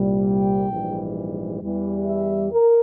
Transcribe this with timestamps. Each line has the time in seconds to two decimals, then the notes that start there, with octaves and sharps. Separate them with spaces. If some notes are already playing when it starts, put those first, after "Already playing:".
Already playing: C2 A#2 G3
0.26 G5
0.71 A#1 G#2 E3 G3
1.62 E2 E3 G3
2.07 E5
2.52 A#4